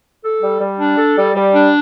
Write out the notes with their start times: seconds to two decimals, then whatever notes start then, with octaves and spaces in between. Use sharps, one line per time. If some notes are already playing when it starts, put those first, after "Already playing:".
0.23 A4
0.42 G3
0.61 G3
0.79 D4
0.98 A4
1.17 G3
1.35 G3
1.53 D4